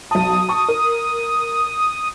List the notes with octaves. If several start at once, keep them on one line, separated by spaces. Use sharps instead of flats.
B1 A5 D#6
A5 C#6
A#4